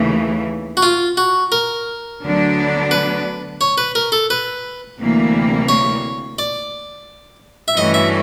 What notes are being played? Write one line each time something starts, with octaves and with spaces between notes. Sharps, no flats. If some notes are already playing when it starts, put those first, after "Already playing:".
Already playing: D#2 C#3 E3 A3
F#4
F4
F#4
A#4
D2 D3 F#3 B3 D4
B4
C#5
B4
A#4
A4
B4
D2 C3 E3 G3 A#3
C#5
D5
E5
G2 E3 A3 C#4 F#4 D#5
E5